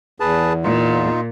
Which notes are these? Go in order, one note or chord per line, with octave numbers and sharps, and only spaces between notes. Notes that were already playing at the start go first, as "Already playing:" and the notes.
E2 G#4 B4 A5
A#2 D#4 F4